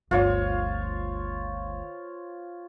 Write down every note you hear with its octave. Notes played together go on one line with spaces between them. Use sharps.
G1 D2 F4 C5 C#5